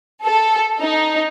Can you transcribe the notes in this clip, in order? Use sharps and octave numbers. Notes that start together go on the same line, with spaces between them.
A4
D#4